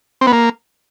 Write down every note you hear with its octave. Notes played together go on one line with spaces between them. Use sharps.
C4
B3
A#3